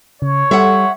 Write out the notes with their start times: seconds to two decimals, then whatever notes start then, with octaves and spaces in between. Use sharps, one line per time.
0.22 C#3 C#5
0.51 G3 A4 E5 F#5 C6